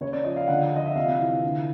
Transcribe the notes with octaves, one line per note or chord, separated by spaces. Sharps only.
C#3 C#5
D5
F3 D#5
F5
D3 F#5
F3 D#5
E5
C3 F5
E3
D3